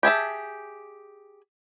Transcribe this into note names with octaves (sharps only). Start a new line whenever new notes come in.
G4 G#4 E5 A5